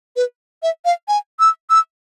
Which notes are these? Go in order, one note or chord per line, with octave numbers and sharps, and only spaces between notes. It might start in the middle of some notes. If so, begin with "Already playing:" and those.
B4
E5
F5
G#5
E6
E6